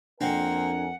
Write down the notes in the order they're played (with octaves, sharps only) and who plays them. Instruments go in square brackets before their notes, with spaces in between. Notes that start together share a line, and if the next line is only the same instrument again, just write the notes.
[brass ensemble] F2 A#4 G#5 [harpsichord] A#3 C4 [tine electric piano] D4 [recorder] F#5